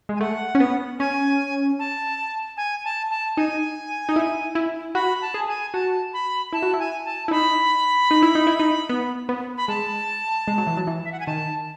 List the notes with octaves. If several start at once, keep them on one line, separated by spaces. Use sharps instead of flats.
G#3
G#5
A3 F#5
C#4
B3
C#4 G#5
A5
G#5
A5
A5
D#4 G#5
D#4
E4
E4
F#4 B5
A5
G#4
G#5
F#4 A5
B5
E4 A5
F#4
E4
G#5
A5
E4
D#4 B5
D#4
E4
D#4
E4
D#4
B3
B3
B5
G#3 A5
G#3
F#3
E3
F#3
E3
E5
F#5
G#5
D#3 A5